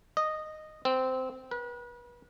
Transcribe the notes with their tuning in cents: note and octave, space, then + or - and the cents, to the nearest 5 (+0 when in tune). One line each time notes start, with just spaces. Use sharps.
D#5 -10
C4 -15
B4 -35